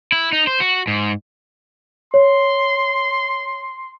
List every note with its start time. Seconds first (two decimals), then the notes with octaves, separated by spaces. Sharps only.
0.12 E4
0.32 D#4
0.47 C5
0.60 F#4
0.87 G#2
2.14 C#5 C6